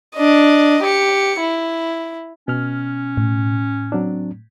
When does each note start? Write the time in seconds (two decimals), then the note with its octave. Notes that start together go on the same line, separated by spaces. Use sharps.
0.16 D4 D#5
0.84 G4 C#7
1.40 E4
2.48 B2 C#4 F6
3.17 A2
3.92 F#3 C4 D4